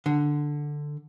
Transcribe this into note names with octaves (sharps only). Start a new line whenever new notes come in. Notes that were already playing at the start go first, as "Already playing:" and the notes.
D3